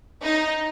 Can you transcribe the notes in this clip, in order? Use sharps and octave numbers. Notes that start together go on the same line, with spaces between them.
D#4